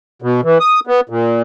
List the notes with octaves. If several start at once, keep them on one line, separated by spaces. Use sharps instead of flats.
B2
E3
D#6
B3
A#2